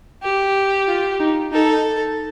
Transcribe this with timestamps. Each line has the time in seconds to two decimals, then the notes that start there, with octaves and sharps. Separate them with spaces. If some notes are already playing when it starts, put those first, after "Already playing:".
0.23 G4
0.88 F4
1.20 D#4
1.52 D#4 A4